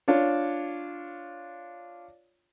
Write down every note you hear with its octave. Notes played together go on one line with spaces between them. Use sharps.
D4 F4 C#5